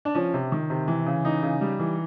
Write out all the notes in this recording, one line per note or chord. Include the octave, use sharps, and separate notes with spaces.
D4
F3 C#4
C3
D#3
C3
E3
C#3
E3 D#4
C#3
G3
E3